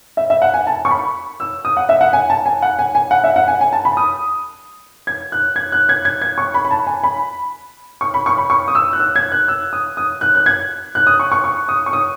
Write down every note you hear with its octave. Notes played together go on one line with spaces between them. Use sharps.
E5
E5
F#5
G#5
A5
C#6
B5
E6
D#6
F#5
E5
F#5
G#5
A5
G#5
F#5
G#5
G#5
F#5
E5
F#5
G#5
G#5
A5
B5
D#6
G#6
F#6
G#6
F#6
G#6
G#6
G#6
C#6
B5
B5
A5
G#5
B5
C#6
B5
C#6
B5
C#6
D#6
E6
F#6
E6
G#6
F#6
E6
D#6
D#6
F#6
F#6
G#6
F#6
D#6
C#6
C#6
C#6
D#6
C#6
D#6